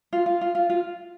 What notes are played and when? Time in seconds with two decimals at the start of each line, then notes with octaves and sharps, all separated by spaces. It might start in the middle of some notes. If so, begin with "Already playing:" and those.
0.13 F4
0.26 F4
0.41 F4
0.55 F4
0.70 F4